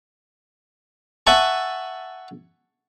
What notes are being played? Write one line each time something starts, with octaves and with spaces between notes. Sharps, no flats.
E5 F#5 G#5 A5 C#6